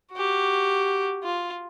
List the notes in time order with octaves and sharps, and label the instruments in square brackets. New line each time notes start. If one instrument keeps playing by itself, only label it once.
[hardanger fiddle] F#4 G4
F4